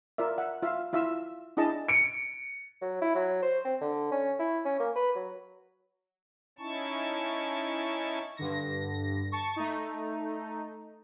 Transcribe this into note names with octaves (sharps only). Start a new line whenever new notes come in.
F4 A#4 D5 E5
E5 F#5
F4 E5 F5
E4 F4 E5 F5 E6
D4 E4 G#4 D#5 A5
C#7 D7
F#3
E4
F#3
C5
C4
D3
C#4
E4
C#4
A#3
B4
F#3
C#4 D#4 E4 A5 C#6
G2 D3 A#6
A5 C#6
A3 D#4